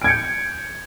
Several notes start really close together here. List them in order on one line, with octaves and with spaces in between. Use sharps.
D7 G#6 C#7 G6